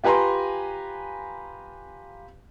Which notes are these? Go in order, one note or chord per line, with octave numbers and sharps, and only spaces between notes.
F4 G4 B4 G#5 A#5 C6